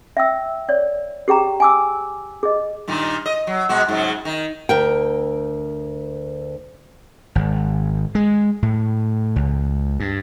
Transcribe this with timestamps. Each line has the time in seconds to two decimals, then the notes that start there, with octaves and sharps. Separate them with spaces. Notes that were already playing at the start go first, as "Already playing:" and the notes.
0.17 E5 G5 E6
0.69 C#5 D5
1.28 G4 G#4 G5 A#5
1.60 G#5 D6 E6
2.43 G#4 D#5
2.88 G2 A#2 D#3
3.26 D#5
3.47 F#3
3.69 B2 G#3 F#4
3.89 G#2 C#3 F#3
4.25 D#3
4.69 D2 A#4 G5
7.35 G#1
8.15 G#3
8.62 A2
9.36 C#2
10.00 G2